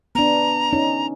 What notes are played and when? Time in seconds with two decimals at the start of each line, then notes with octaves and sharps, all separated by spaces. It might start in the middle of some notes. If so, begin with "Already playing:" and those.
0.15 B3 D4 A#5
0.73 C#4 D#4